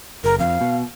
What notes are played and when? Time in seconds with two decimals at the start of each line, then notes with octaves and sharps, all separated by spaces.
0.24 F#1 A#4
0.40 F2 F5
0.61 B2